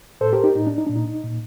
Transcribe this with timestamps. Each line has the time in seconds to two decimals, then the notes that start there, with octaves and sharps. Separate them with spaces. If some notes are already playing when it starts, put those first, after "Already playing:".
0.21 A2 A4 C5
0.33 G4 A#4
0.44 D#4 G4
0.55 A2 D#4
0.67 D4
0.78 D#4
0.87 A#2 D4
0.96 D#4
1.24 A#2